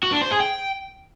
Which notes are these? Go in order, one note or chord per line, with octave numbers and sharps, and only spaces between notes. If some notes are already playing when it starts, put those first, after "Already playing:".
F#4
D4
C5
G#4
G5